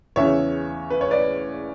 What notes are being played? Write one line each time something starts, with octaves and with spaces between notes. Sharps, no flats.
E2 C#3 E3 C#5 E5
B4
C#5
B4 D5